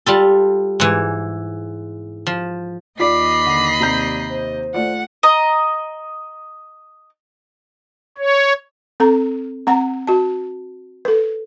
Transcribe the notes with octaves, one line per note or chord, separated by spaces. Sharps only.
G3 F4 A4
G#2 E3
F3
D#2 F4 D5 D#5 B5 D6 B6 C7
D3
C3 D5 A#5 G6
C5
A3 F4 D5 F#5
D#5 A#5
C#5
C4 A4 A#5
C4 F#5 A#5
F#4 A5
A4 B4